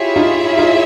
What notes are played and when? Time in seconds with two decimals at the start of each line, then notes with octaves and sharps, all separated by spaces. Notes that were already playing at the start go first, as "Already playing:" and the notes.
Already playing: E4 F4 G4 G#4 C#5 E5
0.16 D#4 F4
0.58 D#4 F4